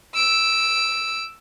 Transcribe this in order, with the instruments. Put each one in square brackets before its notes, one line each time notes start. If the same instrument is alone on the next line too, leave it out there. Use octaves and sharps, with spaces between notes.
[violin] E6 D7